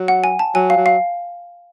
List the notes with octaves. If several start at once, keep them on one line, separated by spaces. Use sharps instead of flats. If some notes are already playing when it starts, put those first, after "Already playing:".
Already playing: F#3
F#5
G#5
A5
F#3 G#5
F5
F#3
F5